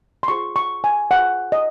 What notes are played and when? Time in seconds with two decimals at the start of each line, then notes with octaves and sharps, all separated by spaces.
0.23 C6
0.28 F4 G#4 C5 C#6
0.56 C#6
0.84 G#5
1.11 F4 G#4 C5 F#5
1.52 D#5